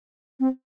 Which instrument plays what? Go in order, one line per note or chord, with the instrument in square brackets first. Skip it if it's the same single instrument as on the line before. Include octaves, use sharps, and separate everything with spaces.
[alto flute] C4